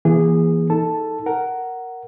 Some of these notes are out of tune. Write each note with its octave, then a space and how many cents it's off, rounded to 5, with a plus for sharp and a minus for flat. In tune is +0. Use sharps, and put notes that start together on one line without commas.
E3 +15 A#3 +40 G#4 -20
D#4 +30 A4 +10 A5 +0
A#4 +0 F#5 +10